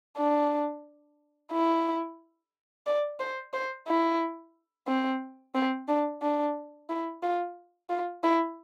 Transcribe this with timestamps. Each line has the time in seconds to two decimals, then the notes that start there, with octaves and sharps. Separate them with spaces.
0.17 D4
1.52 E4
2.86 D5
3.20 C5
3.53 C5
3.87 E4
4.88 C4
5.55 C4
5.88 D4
6.22 D4
6.89 E4
7.23 F4
7.90 F4
8.24 E4